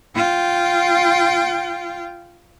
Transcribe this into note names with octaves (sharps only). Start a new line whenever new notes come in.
F4 G5